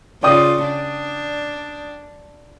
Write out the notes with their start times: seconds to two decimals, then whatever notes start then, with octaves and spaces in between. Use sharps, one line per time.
0.23 C#3 F4 D5 G5 D#6
0.64 D4